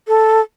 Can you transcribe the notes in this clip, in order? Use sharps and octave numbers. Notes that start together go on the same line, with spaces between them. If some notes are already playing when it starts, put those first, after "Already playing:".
A4